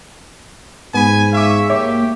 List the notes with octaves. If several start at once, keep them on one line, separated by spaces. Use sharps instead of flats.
G#2 B3 G#5 B5
E5 F5 C#6 D6
A#3 G4 C#5 E5 D6